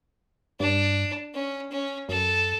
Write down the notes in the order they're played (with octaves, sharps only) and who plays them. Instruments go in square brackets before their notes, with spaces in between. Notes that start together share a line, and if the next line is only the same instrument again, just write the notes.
[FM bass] G2 [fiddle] D4
[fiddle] C#4
C#4
[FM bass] F#2 [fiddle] A4